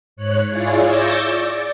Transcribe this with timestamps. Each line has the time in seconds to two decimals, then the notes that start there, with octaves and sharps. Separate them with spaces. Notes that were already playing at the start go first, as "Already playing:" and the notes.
0.16 G#2 C#5 F#6
0.50 E4 F4 G#4 C#5 D5
0.85 C#6 D6 E6 G6 A6 A#6
1.25 D5